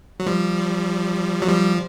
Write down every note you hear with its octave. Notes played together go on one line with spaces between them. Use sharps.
F#3
F3 G3
F#3
F3 G3